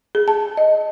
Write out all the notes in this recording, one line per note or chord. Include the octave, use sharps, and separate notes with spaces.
G#4
A5
D#5